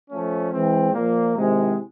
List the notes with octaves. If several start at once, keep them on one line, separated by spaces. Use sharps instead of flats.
F3 A3 C#4
E3 G#3 C4
A#2 F3 A#3
C3 D#3 G#3 C4 E4